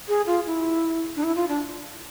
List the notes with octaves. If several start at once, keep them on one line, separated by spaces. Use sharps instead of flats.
G#4
F4
E4
D4
E4
F4
D4